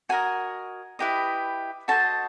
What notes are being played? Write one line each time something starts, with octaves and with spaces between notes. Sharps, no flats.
F#4 A#4 D#5 G#5
E4 G4 B4 D#5
F#4 A4 C5 D#5 A5